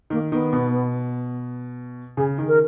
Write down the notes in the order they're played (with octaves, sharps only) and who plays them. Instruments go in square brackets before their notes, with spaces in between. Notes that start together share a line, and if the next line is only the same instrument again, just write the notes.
[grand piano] D#3 [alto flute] A#3
[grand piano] D#3 [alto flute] B3
[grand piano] B2
[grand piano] C#3 [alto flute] G#4
[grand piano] D#3
[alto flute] A#4